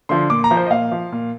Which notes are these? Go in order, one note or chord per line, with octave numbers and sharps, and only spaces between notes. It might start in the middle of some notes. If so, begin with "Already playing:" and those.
D3 F3 C6
A#2 D6
A#5
F3
C5
D#5
A#2 F5
F3
A#2